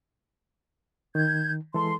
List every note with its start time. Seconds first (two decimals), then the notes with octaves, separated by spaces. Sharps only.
1.15 D#3 G6 G#6
1.74 E3 G#3 A4 C6